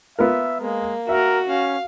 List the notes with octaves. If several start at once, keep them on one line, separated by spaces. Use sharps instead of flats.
B3 F4 A#4 E5
G#3 A#3
F#4 A#4 E5
C#4 F5